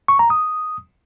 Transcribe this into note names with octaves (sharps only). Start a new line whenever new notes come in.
C#6
A#5
D#6